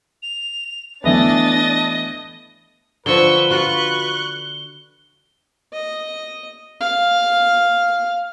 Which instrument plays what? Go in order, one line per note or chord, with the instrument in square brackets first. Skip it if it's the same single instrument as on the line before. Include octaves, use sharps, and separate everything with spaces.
[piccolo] F7
[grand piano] E3 A3 B3 [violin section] D4 A6 [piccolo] D#5
[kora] D3 F3 [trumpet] B4 [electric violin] C#6 E6 [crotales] G7
[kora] F4 F#4 [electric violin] C#6 F#6
[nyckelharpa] D#5
F5